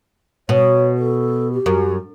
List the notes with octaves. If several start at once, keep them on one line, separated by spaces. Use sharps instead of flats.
B2 C#5
A4
G4
F#2